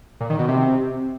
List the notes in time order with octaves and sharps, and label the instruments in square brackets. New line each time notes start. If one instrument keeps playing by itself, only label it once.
[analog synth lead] A#2
D#3
B2
C3